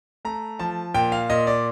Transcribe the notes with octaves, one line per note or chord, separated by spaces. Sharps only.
A3 A#5
F3 A5
A#2 G5
F5
A#2 D#5
D5